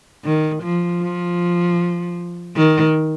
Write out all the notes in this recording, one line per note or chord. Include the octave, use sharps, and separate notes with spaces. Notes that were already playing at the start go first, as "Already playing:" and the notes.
D#3
F3
F3
D#3